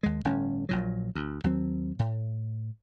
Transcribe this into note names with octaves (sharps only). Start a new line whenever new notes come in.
D#2 G#3
G1 A2 C#4
A#1 A#2 F#3
D2
D#2 F#3 C4
A2